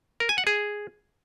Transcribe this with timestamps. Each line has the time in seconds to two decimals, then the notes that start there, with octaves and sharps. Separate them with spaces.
0.20 A#4
0.29 G#5
0.38 F#5
0.47 G#4